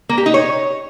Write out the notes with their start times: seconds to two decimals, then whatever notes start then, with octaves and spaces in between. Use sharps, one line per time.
0.09 A#3
0.18 G4
0.26 D#4
0.34 C#5